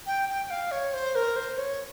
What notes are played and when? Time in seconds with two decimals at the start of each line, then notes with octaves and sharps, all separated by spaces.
0.07 G5
0.29 G5
0.51 F5
0.71 C#5
0.93 C5
1.15 A#4
1.36 C5
1.58 C#5